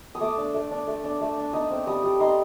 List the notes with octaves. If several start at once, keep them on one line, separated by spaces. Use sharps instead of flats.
D#6
A3 D6
D4
A3
D4
A3
D4
A3
D4
D#4 D#6
C4
G3 D#6
G3
D#4 C6